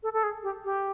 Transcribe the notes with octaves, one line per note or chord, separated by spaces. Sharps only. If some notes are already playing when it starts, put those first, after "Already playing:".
A4
A4
G#4
G4
G4